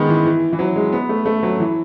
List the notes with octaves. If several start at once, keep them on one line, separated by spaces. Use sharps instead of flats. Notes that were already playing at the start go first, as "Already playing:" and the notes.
Already playing: D#3 G#3 B3
E3
E3
E3
F#3
G#3
B3
A3
A3
F#3
E3